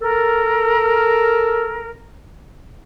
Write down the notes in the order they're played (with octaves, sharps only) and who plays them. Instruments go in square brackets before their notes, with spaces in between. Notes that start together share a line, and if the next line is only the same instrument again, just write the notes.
[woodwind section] A4 A#4